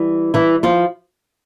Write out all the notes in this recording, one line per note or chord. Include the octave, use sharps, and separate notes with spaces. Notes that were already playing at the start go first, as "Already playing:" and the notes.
Already playing: E3 G3
E3 E4
F3 F4